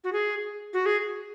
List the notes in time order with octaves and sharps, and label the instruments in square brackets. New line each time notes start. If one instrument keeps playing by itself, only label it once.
[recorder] F#4
G#4
F#4
G#4